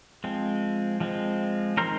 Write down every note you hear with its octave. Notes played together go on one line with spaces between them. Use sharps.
F3 G#3 C4
F3 G#3 C4
D#3 G#3 C4 A#4 C5